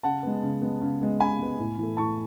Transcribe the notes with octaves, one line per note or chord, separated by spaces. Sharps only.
C#3 F#5 A5
G#3 B3
C#3
G#3 B3
C#3
G#3 B3
C#3 G#5 B5
G#3 B3
A2
E3
A3
A2 A5 C#6